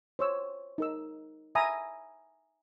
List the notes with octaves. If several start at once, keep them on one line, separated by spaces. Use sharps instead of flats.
C5 C#5 E6
D#4 A#4 E6
E5 G#5 A#5 B5 D#6